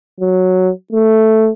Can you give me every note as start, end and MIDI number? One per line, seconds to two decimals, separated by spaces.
0.20 0.70 54
0.93 1.50 57